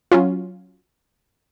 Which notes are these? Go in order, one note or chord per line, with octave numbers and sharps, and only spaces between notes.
F#3 C#4 F4